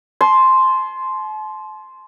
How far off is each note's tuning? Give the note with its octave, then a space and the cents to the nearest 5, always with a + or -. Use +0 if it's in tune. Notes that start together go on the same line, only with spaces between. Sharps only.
A5 -40 C6 +0